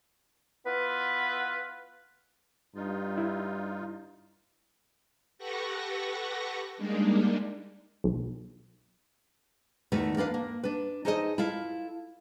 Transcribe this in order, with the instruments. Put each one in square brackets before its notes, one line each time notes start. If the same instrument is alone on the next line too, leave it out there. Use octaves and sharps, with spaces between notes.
[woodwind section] B3 E4 F4 B4
[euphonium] G2 [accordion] D#4 F4
[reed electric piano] E4
[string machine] G4 A4 B4 F#5 C#6 A#6
G3 G#3 A#3 D4 D#4
[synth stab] B1
[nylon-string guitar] E2 D#3 A3 F#4 A4 B4
A#3 D4 B4 F5
A#3
D4 B4
D#4 G#4 A4 C5 C#5 D#5
E4 F4 A4 F5